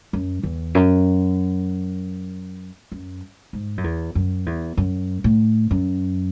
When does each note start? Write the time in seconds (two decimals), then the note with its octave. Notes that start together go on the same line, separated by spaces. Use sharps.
0.13 F#2
0.43 E2
0.75 F#2
2.92 F#2
3.53 G#2
3.78 F#2
3.84 E2
4.15 F#2
4.46 E2
4.77 F#2
5.24 A2
5.71 F#2